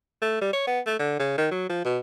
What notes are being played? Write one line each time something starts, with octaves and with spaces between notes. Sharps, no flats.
A3
G3
C#5
B3
A3
D3
C#3
D#3
F#3
F3
B2